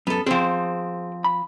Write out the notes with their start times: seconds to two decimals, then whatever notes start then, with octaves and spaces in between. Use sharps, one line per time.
0.07 F#2 B3 A4
0.26 F3 C4 G#4 C5 G5
1.24 B5